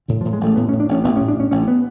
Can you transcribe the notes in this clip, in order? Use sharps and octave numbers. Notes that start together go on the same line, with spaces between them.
A2 D3
A2 F3
G#3
A1 A3
A2 B3
A2 C#4
D4
A1 C#4
A1 B3
A2 C#4
D4
A2 C#4
A1 C#4
B3